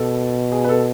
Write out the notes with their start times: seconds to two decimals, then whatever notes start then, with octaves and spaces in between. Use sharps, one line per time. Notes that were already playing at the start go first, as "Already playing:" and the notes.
Already playing: B2 A4
0.52 G#4
0.64 B4
0.69 A4